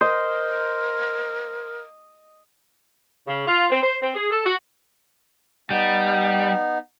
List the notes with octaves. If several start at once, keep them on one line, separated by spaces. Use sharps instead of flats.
A#4 C5 D#5
C#3
F4
C4
C5
C4
G#4
A4
F#4
G3 B3 D#4